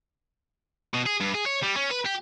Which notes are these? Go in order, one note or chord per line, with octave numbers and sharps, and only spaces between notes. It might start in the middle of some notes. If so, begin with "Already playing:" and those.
B2
G#4
G2
G#4
C#5
G3
C#4
B4
G4